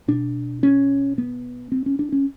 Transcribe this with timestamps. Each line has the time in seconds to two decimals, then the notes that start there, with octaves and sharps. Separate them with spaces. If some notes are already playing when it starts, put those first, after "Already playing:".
0.08 B2 D4
0.63 C#4
1.18 B3
1.72 C4
1.86 C#4
1.99 D4
2.12 C#4